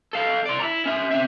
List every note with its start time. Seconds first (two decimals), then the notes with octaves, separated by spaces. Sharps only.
0.13 A4 F5
0.46 D5 C6
0.60 E4 A#5
0.86 C#4 E5
1.11 C4 E5